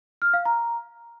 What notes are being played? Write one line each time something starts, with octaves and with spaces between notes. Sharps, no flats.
F6
F5
A#5